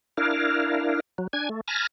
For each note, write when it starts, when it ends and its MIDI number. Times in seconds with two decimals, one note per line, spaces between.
0.17 1.00 62
0.17 1.00 64
0.17 1.00 70
0.17 1.00 77
1.18 1.27 54
1.33 1.49 62
1.33 1.49 80
1.33 1.49 92
1.49 1.61 57
1.68 1.87 80
1.68 1.87 81
1.68 1.87 83
1.68 1.87 89
1.68 1.87 94